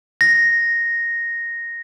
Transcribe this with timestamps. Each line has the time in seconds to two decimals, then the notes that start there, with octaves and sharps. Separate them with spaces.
0.21 A#6